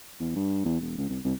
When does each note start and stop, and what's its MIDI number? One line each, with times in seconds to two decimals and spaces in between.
0.20 0.34 40
0.36 0.63 43
0.65 0.79 40
0.81 0.95 28
0.98 1.08 37
1.09 1.19 36
1.25 1.33 36